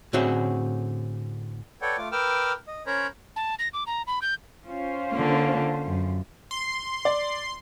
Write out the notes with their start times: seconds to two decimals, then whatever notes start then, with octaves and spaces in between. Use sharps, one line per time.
0.13 A2 D3 C4 C#4 F#4 G#4
1.82 A4 B4 C#5 D5 F#5 G5
1.98 A3 F4 D6
2.12 A#4 B4 G5 D6 E6 F6
2.68 D#5
2.86 C#4 A#4 C5 C#5 A#5 B5
3.36 A5
3.59 A#6
3.73 D6
3.87 A#5
4.07 B5
4.22 G6
4.65 C#4 F4 C5
5.12 D3 A#3
5.86 F#2
6.51 C6
7.05 D5